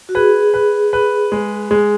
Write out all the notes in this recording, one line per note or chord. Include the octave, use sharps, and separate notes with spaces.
F#4
G#4 B4
B4
B4
G#3
G#3